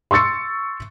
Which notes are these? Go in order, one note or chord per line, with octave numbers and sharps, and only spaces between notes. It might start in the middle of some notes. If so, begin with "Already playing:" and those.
C6 C#6 E6 A6 C#7